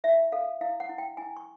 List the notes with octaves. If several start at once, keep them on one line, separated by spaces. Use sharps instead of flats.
E4 E5
A4 F5
E4 F5
F#5
E4
G5
E4 G#5
C#6